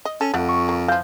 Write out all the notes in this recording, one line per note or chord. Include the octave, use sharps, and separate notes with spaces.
D#5
C#4 A4
F2 A3 F#5
C#6
A#3
E3 F3 F5 G6